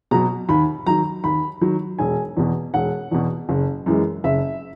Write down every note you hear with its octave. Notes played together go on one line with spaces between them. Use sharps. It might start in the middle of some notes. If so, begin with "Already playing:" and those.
B2 F#3 A#5
D#2 B5
D#3 F#3 A#5
D#2 B5
D#3 F#3
E1 G#5
E2 B2
E1 F#5
E2 B2
F#1
F#2 E3 G#3
F#1 E5